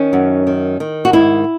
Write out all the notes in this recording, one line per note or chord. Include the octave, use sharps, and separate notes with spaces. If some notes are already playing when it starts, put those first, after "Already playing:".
Already playing: D#3 C#4
F#2
D#3
D#3
F#4
G#2 E4